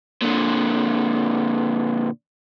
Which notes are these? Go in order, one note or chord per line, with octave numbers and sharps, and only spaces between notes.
A#2 D3